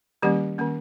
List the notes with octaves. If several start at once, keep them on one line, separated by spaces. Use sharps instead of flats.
D#3 G3 A#3 C#4 G4
D#3 A#3 C#4